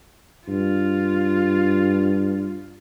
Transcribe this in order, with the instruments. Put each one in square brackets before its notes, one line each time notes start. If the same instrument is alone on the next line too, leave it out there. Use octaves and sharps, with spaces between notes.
[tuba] G2 [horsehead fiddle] F4